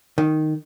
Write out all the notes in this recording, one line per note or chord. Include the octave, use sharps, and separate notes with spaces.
D#3